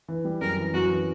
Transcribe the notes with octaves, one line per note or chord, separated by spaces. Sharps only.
E3
G3
F#2 A#4
E3
F#2 F#4
E3